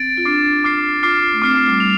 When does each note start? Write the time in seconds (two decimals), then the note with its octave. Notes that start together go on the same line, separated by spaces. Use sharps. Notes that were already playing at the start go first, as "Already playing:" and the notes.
Already playing: C4 A6 D7
0.18 F4
0.25 D4 D6 F6 C7
0.64 D6 F6 C7
1.03 F4 D6 F6 C7
1.22 F4
1.33 A3
1.42 C4 D6 F6 C7
1.54 A3
1.68 G3
1.80 G3 F7